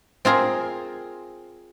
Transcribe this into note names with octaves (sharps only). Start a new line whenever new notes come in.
C4 F4 G#4 A#4